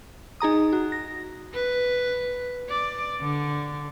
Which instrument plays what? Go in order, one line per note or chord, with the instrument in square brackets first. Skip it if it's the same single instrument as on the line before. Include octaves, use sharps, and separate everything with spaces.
[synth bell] D#4 G#4 A#5 D#6
F#4
A#6
[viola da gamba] B4
D5
D3